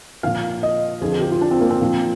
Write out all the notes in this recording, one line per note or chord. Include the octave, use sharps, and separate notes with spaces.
A#2 F3 F5
D#5
F2 D3 F3 G#4
G#4
G4
F4
D4
C4
A#3
C4
A#2 F3